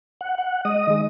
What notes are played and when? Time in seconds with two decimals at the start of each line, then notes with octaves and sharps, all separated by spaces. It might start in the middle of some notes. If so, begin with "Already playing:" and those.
0.21 F#5
0.38 F#5
0.65 G#3 D#5 D#6
0.87 D#3 G#3